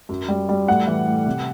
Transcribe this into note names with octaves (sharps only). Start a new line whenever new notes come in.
F#2
G3
G3
A2 F#5
E3
A2
C3